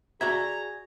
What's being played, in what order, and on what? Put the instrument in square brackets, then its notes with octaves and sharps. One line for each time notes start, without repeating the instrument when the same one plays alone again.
[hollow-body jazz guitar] F#4 D5 E5 [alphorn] G#4 [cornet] A#5 [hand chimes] G#6